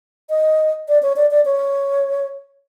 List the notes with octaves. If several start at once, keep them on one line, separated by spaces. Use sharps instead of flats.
D#5
D5
C#5
D5
D5
C#5